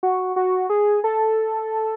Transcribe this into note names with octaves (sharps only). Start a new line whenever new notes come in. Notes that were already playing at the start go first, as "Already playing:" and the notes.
F#4
F#4
G#4
A4